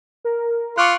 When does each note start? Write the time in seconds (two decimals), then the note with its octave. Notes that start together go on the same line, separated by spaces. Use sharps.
0.25 A#4
0.78 F4 C#6 D6 F#6 C#7